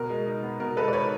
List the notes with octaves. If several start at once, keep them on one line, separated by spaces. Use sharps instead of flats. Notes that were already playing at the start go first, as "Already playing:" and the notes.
Already playing: B2 A#4
G#3
D#4
B3
B2 A#4
G#3 A4 B4
D5
D#4 B4 C#5